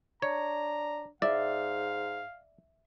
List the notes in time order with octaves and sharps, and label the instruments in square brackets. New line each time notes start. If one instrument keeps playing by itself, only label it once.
[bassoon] D4 [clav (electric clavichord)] C#5 [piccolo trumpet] A#5
[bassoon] G#2 [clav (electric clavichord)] D5 [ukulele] E5 [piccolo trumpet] F5